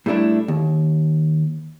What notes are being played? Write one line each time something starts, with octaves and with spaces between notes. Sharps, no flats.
A2 G3 A3 D4 E4
D#2